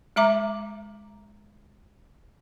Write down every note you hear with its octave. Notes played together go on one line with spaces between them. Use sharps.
G#3 E5 A#5 D6